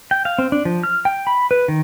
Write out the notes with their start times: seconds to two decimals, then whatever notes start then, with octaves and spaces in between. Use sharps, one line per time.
0.11 G5
0.25 F5
0.38 C4
0.52 D4
0.65 F3
0.83 F6
1.05 G5
1.27 B5
1.51 B4
1.68 D#3